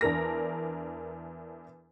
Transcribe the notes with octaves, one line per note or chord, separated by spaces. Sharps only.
E2 D4 A#4 A#6